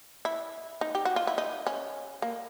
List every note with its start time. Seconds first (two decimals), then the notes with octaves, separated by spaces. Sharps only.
0.25 E4
0.81 D#4
0.95 G4
1.05 F#4
1.16 F4
1.27 E4
1.38 D#4
1.67 C#4
2.22 A#3